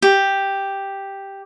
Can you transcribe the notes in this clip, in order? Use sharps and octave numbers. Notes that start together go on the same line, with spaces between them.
G4